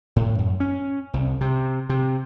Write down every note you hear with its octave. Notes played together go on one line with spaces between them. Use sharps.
A2
F#2
C#4
C2
C3
C3